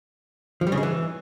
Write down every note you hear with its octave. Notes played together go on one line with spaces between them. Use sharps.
F3
G3
C#3
G#3
E3